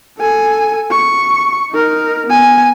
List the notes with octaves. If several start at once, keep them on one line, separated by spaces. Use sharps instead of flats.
A4 G#5
C#6
D#4 A#4
B3 G#5